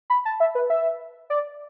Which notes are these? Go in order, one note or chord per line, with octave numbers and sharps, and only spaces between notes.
B5
A5
E5
B4
E5
D5